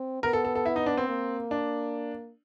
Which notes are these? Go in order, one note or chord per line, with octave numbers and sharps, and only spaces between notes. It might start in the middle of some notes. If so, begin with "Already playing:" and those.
Already playing: C4
B3 A#4
A4
A4
A4
E4
D#4
D4
C4
A#3
D4